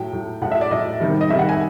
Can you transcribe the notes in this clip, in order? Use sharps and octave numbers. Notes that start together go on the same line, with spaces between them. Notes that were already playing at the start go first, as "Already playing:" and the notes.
Already playing: A2 F#3 G5
A2 F#3
A2 F#3 F#5
E5
D5
A2 F#3 D#5
C3 D#3 G3
D#5
C3 D#3 G3 E5
F#5
G#5